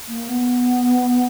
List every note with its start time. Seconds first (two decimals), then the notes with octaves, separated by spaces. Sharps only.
0.08 A#3
0.28 B3